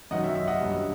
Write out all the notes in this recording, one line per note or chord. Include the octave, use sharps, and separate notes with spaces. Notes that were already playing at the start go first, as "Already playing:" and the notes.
F#2 D#3 F#3 D#5 F#5
E5
E5
D#5 F#5
G2 F#3